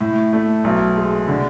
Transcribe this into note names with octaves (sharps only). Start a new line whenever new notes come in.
A2
A3
B1
G#3
D3